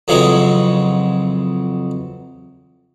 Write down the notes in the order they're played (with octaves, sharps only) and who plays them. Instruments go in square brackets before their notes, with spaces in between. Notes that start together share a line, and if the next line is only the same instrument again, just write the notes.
[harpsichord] F2 C#3 E3 F#3 G#3